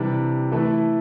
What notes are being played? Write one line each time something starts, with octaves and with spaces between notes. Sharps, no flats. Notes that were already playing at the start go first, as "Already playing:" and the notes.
Already playing: C3 E3 G3 D4
E3 A3 E4 A4